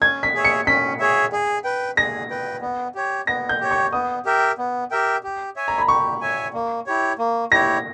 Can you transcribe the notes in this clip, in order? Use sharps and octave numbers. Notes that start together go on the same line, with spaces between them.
C#4 G#6
B6
G#4 C#5 E5
C#7
C#4 B6
G#4 C#5 E5
G#4
B4 G5
G#4 A#6
B4 G5
B3
G4 C#5
B3 A#6
G6
G4 C#5
C#6
B3 D#6
G4 A#4 E5 G5
B3
G4 A#4 E5 G5
G4
C#5 E5 G#5
A#5
B5
G4 C#6
C#5 E5 G#5
A#3
E4 G4 C#5
A#3
E4 G4 C#5 A#6